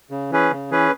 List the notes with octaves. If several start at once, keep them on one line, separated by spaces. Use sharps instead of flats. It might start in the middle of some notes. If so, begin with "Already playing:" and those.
C#3
E3 C#4 G#4 B4
C#3
E3 C#4 G#4 B4